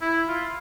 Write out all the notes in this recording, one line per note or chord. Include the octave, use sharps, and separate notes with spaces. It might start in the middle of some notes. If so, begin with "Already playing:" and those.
E4
F4